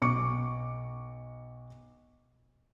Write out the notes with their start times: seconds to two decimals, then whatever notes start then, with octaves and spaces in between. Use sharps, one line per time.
0.02 B1 C#6 D6 C#7